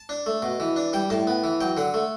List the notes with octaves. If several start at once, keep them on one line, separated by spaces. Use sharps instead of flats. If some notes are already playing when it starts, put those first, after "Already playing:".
Already playing: A5
D4
A3
B2
E3
D4
G3 G5
A2 A5
B3
E3
F#3 G5
D3 F#5
A3